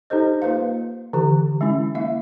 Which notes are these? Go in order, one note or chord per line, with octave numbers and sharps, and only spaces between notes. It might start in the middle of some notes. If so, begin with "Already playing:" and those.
D#4 G4 A4 C5 D#5
A#3 F4 B4 C5 F5
D3 E3 G4
G#3 C#4 E4
A#3 E4 E5 F5